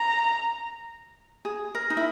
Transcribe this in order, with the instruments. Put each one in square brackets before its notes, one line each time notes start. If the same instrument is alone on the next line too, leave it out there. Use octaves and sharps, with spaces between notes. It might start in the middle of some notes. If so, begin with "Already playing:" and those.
Already playing: [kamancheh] A#5
[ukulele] G#4
A#4
D#4
E4